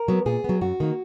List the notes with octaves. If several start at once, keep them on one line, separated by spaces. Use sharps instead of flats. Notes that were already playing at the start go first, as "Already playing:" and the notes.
Already playing: A#4
F#3 B3
A#2 G#4
F#3 B3
F#2 F#4
D#3 A#3